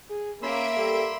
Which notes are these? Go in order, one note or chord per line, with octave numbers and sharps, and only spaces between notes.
G#4
A#3 C#4 E5 B5 C6 E6 D7
G3 A4